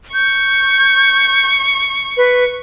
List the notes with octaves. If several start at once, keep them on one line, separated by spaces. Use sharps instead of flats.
C#6 G6
B4